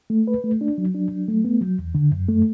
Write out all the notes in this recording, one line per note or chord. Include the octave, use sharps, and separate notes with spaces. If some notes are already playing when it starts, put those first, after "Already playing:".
A3
B4
A3
D4
F#3
D4
F#3
A3
B3
F#3
E2
D3
F#2
A3